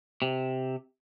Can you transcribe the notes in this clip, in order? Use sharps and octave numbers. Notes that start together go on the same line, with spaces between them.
C3